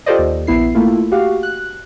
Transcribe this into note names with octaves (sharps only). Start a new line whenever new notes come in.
F4 G4 A4 C5 D5 D#5
D#2
A#1 B3 E4 C7
A3 A#3 E4 F4
F#4 G4 F5
F#6